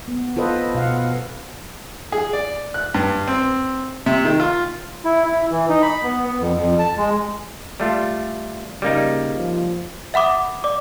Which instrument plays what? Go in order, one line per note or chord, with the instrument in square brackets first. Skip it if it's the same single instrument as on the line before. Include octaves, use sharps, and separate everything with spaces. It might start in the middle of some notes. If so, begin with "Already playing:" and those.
[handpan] B3
F4 A4 B4 C5 D#5
B2 F5 F#5
[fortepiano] G#4
D5
F#6
G2
C4
C3
D#3
F4
[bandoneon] E4
E4
E3
D#4
B5
B3
B3
F2
F2
A5
G#3
[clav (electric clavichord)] G3 A3 F4
[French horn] C#3 [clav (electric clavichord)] G3 A#3 D#4
[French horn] F3
[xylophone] E5 F#5 B5 D6 D#6
D5 D6